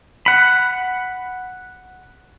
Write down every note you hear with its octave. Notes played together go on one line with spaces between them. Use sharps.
F#5 B5